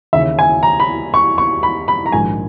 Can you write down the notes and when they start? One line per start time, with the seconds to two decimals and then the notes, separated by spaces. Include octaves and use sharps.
0.13 D#2 C#3 E3 E5
0.39 G#5
0.63 A#5
0.80 B5
1.14 C#6
1.38 C#6
1.63 B5
1.88 B5
2.06 A#5
2.12 A#1 G#2 D#3 G#5